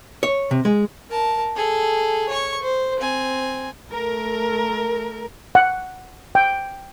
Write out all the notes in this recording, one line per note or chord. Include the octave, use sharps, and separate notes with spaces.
C#5
C3
G#3
A#4 A5
G#4 A4
C#5 C#6
C5
C4 G#5
A3 A#4
F#5
G5